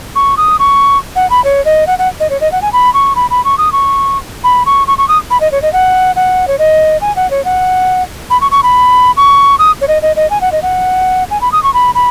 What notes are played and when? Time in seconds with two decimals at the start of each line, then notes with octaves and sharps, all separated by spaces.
0.16 C#6
0.37 D#6
0.59 C#6
1.16 F#5
1.30 B5
1.44 C#5
1.65 D#5
1.87 F#5
1.98 F#5
2.20 D#5
2.30 C#5
2.41 D#5
2.52 F#5
2.62 G#5
2.73 B5
2.94 C#6
3.16 B5
3.30 B5
3.45 C#6
3.58 D#6
3.72 C#6
4.44 B5
4.66 C#6
4.87 C#6
4.98 C#6
5.08 D#6
5.30 B5
5.40 D#5
5.52 C#5
5.62 D#5
5.73 F#5
6.16 F#5
6.48 C#5
6.58 D#5
7.01 G#5
7.16 F#5
7.31 C#5
7.45 F#5
8.30 B5
8.41 C#6
8.51 C#6
8.63 B5
9.17 C#6
9.59 D#6
9.81 C#5
9.88 D#5
10.02 D#5
10.16 D#5
10.30 G#5
10.41 F#5
10.52 D#5
10.62 F#5
11.31 G#5
11.41 B5
11.52 D#6
11.63 C#6
11.74 B5
11.95 B5